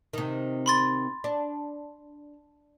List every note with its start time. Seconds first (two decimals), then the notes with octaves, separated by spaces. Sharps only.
0.13 C3 D#3
0.66 B5 C6 A6
1.24 D4